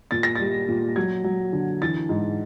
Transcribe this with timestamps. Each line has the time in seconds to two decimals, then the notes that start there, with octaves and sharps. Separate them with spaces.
0.11 A#2 A6
0.23 A#6
0.35 G3 A6
0.69 A#2
0.96 F#3 G#6
1.24 F#3
1.53 D3
1.82 E3 A6
2.09 G#2